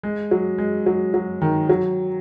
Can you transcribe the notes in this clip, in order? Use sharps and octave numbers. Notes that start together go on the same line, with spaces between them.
G#3
F#3
G#3
F#3
F#3
D#3
F#3